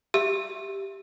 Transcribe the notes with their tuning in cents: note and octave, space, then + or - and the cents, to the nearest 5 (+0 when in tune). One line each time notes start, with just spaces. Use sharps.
G4 +0 E5 +0 E6 +0